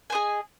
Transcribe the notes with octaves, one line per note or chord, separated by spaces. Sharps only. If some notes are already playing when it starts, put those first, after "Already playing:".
G#4 C5 D#5 G#5